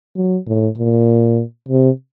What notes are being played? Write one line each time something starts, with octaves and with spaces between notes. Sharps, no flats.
F#3
A2
A#2
C3